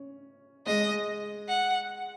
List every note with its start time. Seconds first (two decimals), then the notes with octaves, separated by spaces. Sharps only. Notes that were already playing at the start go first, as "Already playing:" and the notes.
Already playing: C#4
0.66 G#3 D#5
1.49 F#5